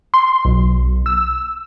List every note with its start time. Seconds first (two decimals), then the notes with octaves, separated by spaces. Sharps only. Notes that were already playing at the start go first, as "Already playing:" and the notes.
0.14 C6
0.45 B1
1.06 E6